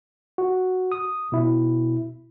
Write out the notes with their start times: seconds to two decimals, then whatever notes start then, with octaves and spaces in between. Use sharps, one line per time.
0.38 F#4
0.92 D#6
1.32 B2 E4